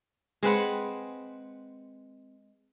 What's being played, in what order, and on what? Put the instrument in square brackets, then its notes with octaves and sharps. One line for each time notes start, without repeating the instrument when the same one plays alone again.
[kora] G#3 C4 B4 F#5